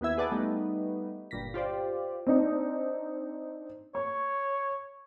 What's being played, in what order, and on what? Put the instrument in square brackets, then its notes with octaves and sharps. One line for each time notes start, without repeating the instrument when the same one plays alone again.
[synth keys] D#2 B3 E4 E5 G#6
G#4 B4 D5 F#5 A5 D#6
G3 A3 B3 D#4
G1 G2 A#2 A#6 B6
F4 G4 C5 D5
[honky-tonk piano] C4 D4 D#4
[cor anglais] C#5 [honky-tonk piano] C#6